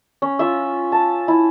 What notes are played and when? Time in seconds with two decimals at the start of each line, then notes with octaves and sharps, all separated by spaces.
0.22 C#4
0.39 F4 E5
0.92 A5
1.28 E4